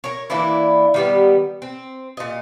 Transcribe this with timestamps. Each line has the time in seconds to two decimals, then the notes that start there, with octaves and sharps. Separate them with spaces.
0.04 A#4 C#5
0.30 E3 A#3 D4 E4
0.94 D#3 G3 B3
1.62 C4
2.17 A#2 D#5